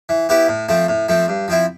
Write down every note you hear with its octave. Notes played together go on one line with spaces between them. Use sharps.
E3
B3 E4 G4
A2
F3 A3 C4
A2
F3 A3 C4
G2
F3 C4 E4